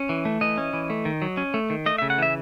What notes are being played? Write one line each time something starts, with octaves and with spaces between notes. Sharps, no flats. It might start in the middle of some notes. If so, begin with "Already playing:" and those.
Already playing: C#4
E3
A3
E3 D#5
C#4
E3
A3
D#3
F#3
C#4
A3
D#3
A3 D#5
C#3 E5
F#5
E3 E5